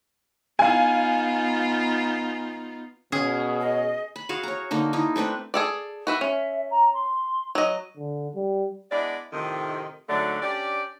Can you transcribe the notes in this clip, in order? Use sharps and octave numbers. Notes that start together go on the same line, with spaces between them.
B3 D#4 F4 F5 G#5
B2 C#4 G#4
D#5
B5
F#4 G#4 F5
C#5 A#5
D3 A#3 D#4
D#4 E4
A3 C4 D4 B4
G#4 A4 D5
F#4 B4 E5
C#4 E5
A#5
C6
F#3 D#5
D3
G3
G#3 B3 D4 E4 D5
F2 A2 C3 D#3
D2 G#2 D3 F#3 A3 D5
C#4 D4 G4 D5